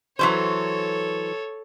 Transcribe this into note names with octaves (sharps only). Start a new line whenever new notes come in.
E3 F#3 A4 C5 C#5